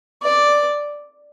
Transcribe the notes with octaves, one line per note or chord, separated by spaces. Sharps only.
D5